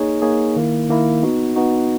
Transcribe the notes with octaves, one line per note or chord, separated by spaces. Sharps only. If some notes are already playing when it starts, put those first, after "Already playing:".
Already playing: A#3 D#4 G#4 C#5
A#3 D#4 G#4 C#5
D#3 A#3 E4
D#3 A#3 E4
B3 D#4 F#4
B3 D#4 F#4